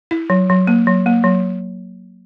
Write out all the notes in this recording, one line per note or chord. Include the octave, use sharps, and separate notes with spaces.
E4
F#3
F#3
A#3
F#3
A#3
F#3